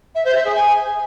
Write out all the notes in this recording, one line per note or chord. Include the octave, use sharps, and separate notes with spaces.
E5
C5
E5
G#4
G#5